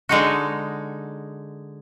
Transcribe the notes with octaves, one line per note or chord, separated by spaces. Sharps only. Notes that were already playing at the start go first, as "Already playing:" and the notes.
D3 G#3 D#4 F#4